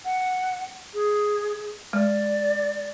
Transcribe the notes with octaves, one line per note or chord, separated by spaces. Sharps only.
F#5
G#4
G#3 D5